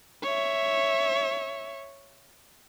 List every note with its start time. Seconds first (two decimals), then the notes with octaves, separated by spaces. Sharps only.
0.23 C#5 E5